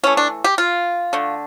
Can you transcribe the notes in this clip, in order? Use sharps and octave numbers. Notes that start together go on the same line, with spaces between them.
E3 A3 C#4
D4
G4
F4
D3 A3